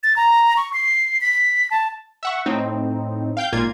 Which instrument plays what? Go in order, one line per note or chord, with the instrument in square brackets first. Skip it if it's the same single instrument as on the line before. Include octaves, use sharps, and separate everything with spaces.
[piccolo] A6
A#5
C#6
C7
B6
A5
[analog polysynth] E5 F#5 C#6
A2 C4 D#4
F5 G5 G6
G#1 A#2 A#3 F4 G#6